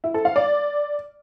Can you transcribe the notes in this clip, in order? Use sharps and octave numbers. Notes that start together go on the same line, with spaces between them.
E4
A4
F5
D5